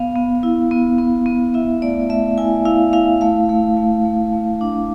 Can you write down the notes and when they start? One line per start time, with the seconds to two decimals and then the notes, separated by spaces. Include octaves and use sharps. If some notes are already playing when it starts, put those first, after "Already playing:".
Already playing: B3 F5
0.16 B3
0.43 E4
0.71 B3
0.98 B3
1.26 B3
1.54 E4 E5
1.82 A3 D5
2.09 A3 E5
2.38 E4 G#5
2.65 E4 F5
2.93 E4 F5
3.21 A3 F5
3.49 A3
3.77 A3
4.05 A3
4.33 A3
4.61 D4